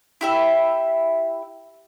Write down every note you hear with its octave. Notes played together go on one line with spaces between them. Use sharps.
E4 G4 E5